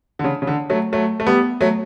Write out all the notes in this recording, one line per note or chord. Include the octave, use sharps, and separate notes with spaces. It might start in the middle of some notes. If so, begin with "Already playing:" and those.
D3
C#3
C#3
D3
F#3 A3
F#3 A3
A3
G3 B3
F#3 A3